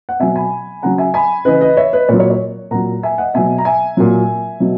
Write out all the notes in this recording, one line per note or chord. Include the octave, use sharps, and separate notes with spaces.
F#5
B2 F#3 E5 G#5
G#5 B5
C#3 F#3 F#5 A#5
E5 G#5
G#5 B5
C#3 E3 B4 D#5
B4 D#5
C#5 E5
B4 D#5
A#2 F#3 C#5
C#5
C#5
A#2 F#3 F#5 A#5
E5 G#5
D#5 F#5
B2 F#3 E5 G#5
A#5
E5 G#5
A#2 F#3
B2 F#3